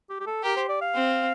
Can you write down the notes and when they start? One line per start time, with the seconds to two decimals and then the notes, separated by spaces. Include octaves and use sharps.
0.10 G4
0.20 G4
0.27 A4
0.43 G4 A#4
0.56 C5
0.69 D5
0.81 F5
0.94 C4